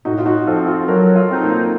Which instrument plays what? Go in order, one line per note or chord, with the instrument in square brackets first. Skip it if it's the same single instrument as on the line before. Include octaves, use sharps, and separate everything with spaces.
[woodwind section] A2 [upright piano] D#4 F#4
[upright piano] F4
D#4 F#4
[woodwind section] F3 C4 [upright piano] F4 A4
[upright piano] F4 A4
[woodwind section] F#3 [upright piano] F#4 A#4
[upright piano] F4 A4
[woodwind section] C4 D#4
[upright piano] A#3